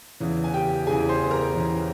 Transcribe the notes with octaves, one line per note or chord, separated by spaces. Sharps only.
E2 C#3 E3
G#5
G4 G5
E2 C#3 E3 G#4 G#5
C5 C6
A#4 A#5
E2 C#3 E3